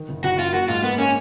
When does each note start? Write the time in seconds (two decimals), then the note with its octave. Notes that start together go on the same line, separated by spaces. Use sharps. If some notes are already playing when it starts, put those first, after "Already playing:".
Already playing: D#3
0.09 F#1
0.24 F#1 F#4
0.39 F#2 F4
0.53 A#3 F#4
0.69 G#2 F4
0.83 A#3 B3
0.98 A#3 C#4